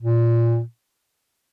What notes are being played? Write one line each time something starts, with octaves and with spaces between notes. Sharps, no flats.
A#2